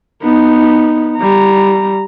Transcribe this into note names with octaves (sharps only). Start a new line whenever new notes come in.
B3 D#4
G3 A#5